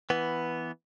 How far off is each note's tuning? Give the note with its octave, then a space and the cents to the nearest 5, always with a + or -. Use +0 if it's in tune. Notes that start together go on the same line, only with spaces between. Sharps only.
E3 +0 B3 +0